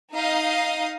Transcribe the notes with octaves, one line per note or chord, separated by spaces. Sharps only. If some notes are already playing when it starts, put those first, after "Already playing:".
D#4 D#5 F5 D#6